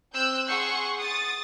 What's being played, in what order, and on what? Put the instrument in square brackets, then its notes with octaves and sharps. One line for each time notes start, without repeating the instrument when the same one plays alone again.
[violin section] C4 E6 F#6 G6
G#4 F#5 C6 C#6
D#6 A6